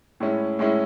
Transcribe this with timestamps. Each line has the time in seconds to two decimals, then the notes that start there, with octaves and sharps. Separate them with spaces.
0.20 A2 G#3 C#4 E4
0.59 A2 G#3 C#4 E4